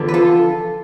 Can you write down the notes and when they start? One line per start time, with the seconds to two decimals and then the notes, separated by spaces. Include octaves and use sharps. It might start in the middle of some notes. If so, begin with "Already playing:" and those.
Already playing: E2 D3 F3 B3
0.09 B4
0.14 F4 A4